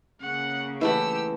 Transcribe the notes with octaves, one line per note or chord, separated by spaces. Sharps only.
C#3 A#3 C#4 F#5
E3 A3 G4 F#5 E6